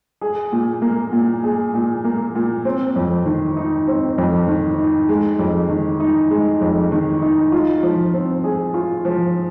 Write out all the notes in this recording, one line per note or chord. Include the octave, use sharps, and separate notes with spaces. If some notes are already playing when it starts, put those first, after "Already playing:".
G#4
A#2
A#3
A#2
G#4
A#2
A#3
A#2
C4
F2
D#3
D#4
C4
F2
D#3
D#4
G#3
F2
D#3
D#4
G#3
F2
D#3
D#4
F4
F3
C4
G#4
F4
F3